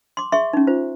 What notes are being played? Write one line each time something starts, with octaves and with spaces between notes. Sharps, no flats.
C6 D6
G#4 E5 C6 C#6
C#4 D#4
F4 C5